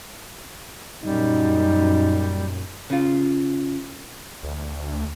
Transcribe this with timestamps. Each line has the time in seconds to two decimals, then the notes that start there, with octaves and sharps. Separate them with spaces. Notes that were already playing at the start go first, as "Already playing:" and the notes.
1.04 F#2 A#2 G3 D#4
2.90 C#3 F4
4.43 D2